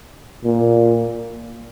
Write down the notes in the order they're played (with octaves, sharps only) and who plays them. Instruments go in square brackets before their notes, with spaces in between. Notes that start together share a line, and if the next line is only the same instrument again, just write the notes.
[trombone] A#2